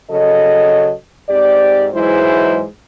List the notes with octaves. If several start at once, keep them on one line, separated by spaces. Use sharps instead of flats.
C#3 F#3 A4 D#5
G#2 C4 G4 D5
G#2 E3 F#3 G#3 E4 C5